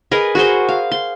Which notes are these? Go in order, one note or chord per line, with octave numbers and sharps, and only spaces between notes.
G#4 A#4 B4 D#5
F#4 G#4 C5
F5
C6